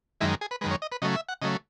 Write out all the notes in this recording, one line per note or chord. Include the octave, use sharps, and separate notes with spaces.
F#2 D#3 G#3 E4
G#4
B4
F#2 D#3 G#3 B4
C#5
D#5
B4
C#3 F#3 A3 D#5
E5
F#5
C#3 F#3 A3 D#5